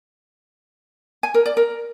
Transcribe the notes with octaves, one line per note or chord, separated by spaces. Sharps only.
G#5
A#4
D5
A#4